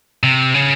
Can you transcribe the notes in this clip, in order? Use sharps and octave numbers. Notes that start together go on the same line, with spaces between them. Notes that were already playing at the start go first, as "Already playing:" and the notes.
C3
C#3